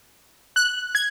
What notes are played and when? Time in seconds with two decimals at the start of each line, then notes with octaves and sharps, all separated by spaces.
0.56 F#6
0.95 G#6